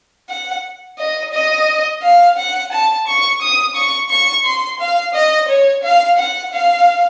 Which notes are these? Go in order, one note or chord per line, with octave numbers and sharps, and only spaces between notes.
F#5
D#5
D#5
F5
F#5
A5
C#6
D#6
C#6
C#6
C6
F5
D#5
C#5
F5
F#5
F5